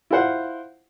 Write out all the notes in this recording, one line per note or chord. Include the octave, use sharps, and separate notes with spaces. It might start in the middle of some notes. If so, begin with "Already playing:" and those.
E4 F4 C5 F#5